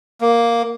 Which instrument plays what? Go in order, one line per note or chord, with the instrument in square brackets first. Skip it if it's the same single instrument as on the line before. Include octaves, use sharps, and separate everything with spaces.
[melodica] A#3